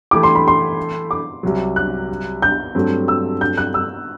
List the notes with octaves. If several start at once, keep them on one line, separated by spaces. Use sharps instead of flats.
E3 A3 E4 G4 D6
C6
B5
C6
D6
C2 C3 F#3
F#6
G6
G2 F#3 A3 C4
E6
G6
F#6
E6